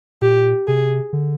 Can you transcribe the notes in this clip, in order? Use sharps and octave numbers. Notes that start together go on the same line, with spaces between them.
A#2 G4
C3 G#4
D3